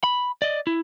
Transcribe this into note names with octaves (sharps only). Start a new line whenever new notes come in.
B5
D5 D#5
E4